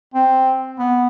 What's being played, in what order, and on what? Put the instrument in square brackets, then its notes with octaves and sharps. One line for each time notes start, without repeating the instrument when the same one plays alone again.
[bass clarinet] C4
B3